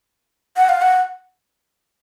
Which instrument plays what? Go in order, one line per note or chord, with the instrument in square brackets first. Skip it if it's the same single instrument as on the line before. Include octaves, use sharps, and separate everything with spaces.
[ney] F#5
F5
F#5